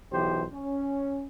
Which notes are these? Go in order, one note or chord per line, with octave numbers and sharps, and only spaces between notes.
B1 E3 G4 C5
C#4